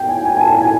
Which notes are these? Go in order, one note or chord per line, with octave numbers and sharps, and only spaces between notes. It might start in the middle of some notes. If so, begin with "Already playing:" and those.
Already playing: G5
G#5
G#5
G#5
A5
G#5